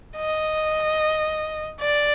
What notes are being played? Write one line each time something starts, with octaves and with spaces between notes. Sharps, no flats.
D#5
D5